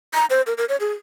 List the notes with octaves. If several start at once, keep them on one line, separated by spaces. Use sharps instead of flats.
A#5
C5
A#4
A#4
C#5
G#4